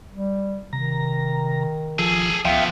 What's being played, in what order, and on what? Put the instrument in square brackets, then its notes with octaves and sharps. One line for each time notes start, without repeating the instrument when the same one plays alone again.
[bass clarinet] G3
[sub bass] C3 [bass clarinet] D#3 [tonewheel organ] A#5
[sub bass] F#1 [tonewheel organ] F3 [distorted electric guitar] G#4 A4
[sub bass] C#2 [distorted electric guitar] F3 B3 [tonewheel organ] E5 F5 G5